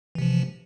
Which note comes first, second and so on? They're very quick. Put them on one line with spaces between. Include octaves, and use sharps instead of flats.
E3 C3 F3